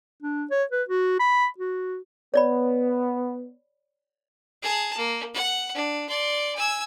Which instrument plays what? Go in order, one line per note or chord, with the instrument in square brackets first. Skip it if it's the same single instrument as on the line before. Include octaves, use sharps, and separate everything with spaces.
[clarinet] D4
C#5
B4
F#4
B5
F#4
[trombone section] B3 [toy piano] C#5 D5 B5
[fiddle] G#4 A5
A#3
F#5
D4
D5 C6
G#5 E6